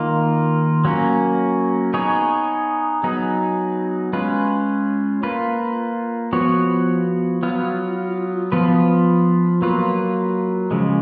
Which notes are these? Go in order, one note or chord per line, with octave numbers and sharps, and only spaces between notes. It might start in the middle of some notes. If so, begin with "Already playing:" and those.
Already playing: D#3 A#3 F4
F#3 A#3 C#4
B3 D#4 G#4 C#5
F#3 B3 D#4 G#4
G#3 C#4 F4 B4
A#3 F4 B4
F3 B3 F#4 C#5
F#3 B3 F4
F3 B3 F4 B4
F#3 A#3 F4 B4
C#3 F3 G#3